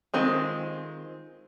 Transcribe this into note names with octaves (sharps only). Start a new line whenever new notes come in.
D#3 G#3 C4 F4